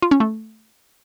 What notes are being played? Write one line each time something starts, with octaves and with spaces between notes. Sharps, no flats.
F4
C#4
A3